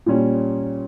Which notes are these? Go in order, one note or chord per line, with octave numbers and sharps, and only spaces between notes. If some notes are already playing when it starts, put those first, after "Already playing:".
A#2 G3 C#4